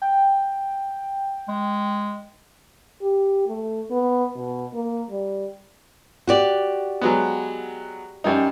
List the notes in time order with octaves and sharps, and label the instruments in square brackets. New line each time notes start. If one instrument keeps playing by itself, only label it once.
[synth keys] G5
[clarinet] G#3
[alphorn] G4
A3
B3
B2
A#3
G3
[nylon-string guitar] F#4 G4 D5
[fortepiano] F#3 G#3 B3
F#2 G3 D#4